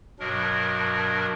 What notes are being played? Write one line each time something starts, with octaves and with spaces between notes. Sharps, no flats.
G2 B2 F#3 D4 A#4